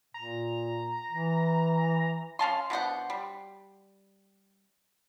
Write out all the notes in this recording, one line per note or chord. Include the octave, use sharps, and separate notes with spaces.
A#2 A#5
E3
C#4 F5 A5 C6
B2 D4 C5 F#5
G3